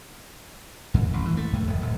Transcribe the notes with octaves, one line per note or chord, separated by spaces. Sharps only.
F2
A1
E3
A3
F#2
D1
D1